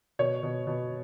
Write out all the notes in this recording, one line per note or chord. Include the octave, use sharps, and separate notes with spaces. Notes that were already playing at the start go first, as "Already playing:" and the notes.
B2 C#5
B2
B2